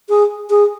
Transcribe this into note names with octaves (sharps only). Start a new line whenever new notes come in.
G#4
G#4